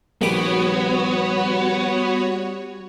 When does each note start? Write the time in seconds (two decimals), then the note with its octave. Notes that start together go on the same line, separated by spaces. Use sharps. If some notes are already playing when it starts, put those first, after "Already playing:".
0.22 A#1 D#3 G3 B3 F#4 C#5 D6